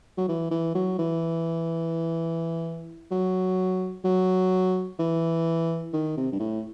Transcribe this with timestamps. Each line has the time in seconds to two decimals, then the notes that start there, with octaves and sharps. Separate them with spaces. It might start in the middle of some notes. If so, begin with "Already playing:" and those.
0.18 F#3
0.28 E3
0.51 E3
0.75 F#3
0.99 E3
3.11 F#3
4.04 F#3
4.99 E3
5.93 D#3
6.17 C3
6.32 G2
6.40 A2